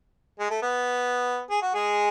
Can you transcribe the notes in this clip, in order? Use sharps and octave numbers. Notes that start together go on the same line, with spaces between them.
G#3
A3
B3
G#4
F#4
G#3 G#4